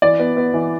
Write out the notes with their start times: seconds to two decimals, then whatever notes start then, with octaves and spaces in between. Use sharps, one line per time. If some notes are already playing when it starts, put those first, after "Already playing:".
0.02 E3 D5
0.19 B3
0.37 B3
0.54 E3